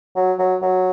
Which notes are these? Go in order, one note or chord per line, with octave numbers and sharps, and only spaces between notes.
F#3
F#3
F#3